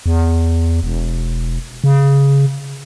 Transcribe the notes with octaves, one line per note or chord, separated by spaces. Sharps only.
E2
E1
C#3